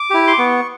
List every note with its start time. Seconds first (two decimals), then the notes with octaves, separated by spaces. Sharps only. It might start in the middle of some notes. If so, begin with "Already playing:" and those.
Already playing: D6
0.10 E4 G4
0.27 C6
0.38 B3 C#6